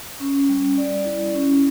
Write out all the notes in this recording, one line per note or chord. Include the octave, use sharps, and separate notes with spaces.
C#4
G3
D5
E4
C#4